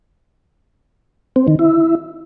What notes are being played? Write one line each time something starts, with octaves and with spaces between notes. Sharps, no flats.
C4
D#3
E4